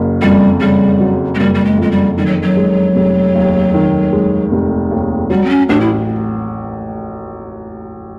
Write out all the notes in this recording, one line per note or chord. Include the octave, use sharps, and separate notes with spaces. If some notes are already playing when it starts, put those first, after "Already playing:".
Already playing: F#1 C#3 F#3
F2 G3
C#3 G3
F#3
G#3
F#1 G3
G3
G#3
F2 G#3
G3
D#3 G3
F#3
F#3
G#3
F1
D#2
D#3
G#3
F1
D#2
F#3 G3
C4
C#4
A1 D4
E4